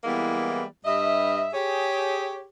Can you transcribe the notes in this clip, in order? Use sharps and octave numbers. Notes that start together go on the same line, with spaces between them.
E3 G3 G#3 A#3 B3 E4
G2 D#5 E5
G4 G#4 C#5